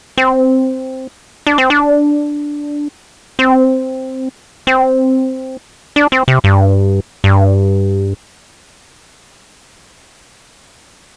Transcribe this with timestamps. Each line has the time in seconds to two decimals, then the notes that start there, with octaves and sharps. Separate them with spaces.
0.17 C4
1.47 D4
1.58 C4
1.70 D4
3.39 C4
4.67 C4
5.96 D4
6.12 C4
6.28 C3
6.44 G2
7.24 G2